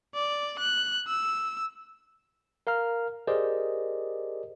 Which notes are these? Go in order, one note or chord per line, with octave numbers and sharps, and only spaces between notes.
D5
F#6
E6
A#4 F5 A#5 F6
G4 G#4 A#4 C5 D5 D#5